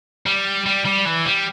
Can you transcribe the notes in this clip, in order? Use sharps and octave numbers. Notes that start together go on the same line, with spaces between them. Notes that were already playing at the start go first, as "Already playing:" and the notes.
G3
G3
G3
E3
G3